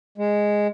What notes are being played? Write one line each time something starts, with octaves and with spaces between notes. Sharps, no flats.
G#3